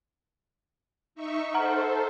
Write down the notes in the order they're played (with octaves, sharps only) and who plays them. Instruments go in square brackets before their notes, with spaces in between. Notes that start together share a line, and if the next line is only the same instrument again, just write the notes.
[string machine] D#4 E5 C#6
[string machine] A4 C5 [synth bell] F#5 A#5 F6